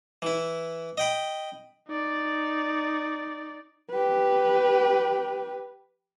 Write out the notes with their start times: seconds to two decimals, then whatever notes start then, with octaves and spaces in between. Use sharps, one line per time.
0.22 E3 E4
0.98 D#5 G5 B5
1.88 D#4 D5
3.91 G4 B4